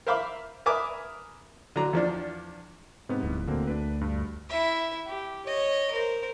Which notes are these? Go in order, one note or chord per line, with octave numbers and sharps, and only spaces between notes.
A#4 C5 E5 F5 B5 D6
A#4 B4 E5 G#5 D6 D#6
D3 F#3 A#5
E2 F3 D4
G#2 C3 B3
D1
D2 D3 A#3 C4
D4 B4
G2
E4 E5
G4
C#5 D#5
A#4 C5